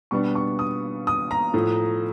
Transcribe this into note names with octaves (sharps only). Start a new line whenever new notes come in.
B2 G3 B3 D4 C#6
C#6
D#6
D#6
A#5
A2 F3 A3